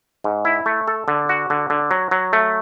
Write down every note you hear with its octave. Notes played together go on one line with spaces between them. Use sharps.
G#2
E4
A3
A4
D3
F#4
D3
D3
F#3
F#3
A3